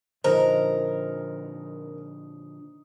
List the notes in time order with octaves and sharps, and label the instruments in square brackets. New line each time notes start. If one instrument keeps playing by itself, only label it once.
[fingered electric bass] A#2 D3 F3 [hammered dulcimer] D#4 [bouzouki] A#4 [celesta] C5